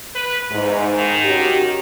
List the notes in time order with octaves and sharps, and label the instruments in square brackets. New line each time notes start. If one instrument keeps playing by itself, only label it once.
[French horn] B4
[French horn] E2 [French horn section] G#2
[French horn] D#3
[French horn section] C#4 F#4 G4